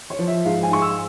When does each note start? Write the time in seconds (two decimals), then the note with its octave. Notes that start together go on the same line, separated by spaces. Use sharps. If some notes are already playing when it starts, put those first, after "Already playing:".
0.10 C#5
0.19 F3
0.27 E5
0.45 G#2 F5
0.63 G#5
0.72 G#2 C#6
0.82 E6